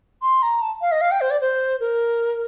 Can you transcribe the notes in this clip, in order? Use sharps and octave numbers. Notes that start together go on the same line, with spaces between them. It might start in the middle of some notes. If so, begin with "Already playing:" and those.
C6
A#5
A5
F5
D#5
F5
G5
C5
D5
C5
A#4